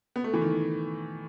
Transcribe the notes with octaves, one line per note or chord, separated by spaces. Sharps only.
B3
A3
E3
D#3